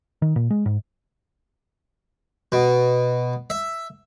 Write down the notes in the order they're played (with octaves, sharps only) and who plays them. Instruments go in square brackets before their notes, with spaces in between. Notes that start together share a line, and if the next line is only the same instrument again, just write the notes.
[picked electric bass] D#3
A#2
G#3
G#2
[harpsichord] B2
E5